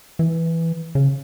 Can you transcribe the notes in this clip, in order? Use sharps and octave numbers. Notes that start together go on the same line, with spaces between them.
E3
C#3